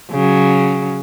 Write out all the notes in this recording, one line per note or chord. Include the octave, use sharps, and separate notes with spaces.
C#3 F#3